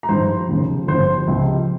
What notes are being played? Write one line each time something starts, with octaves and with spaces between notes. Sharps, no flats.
A#5
G#1 G2 F3 C5 C6
F1 D#2 C#3 F3
G1 G2 F3 C5 C6
C#2 C3 F3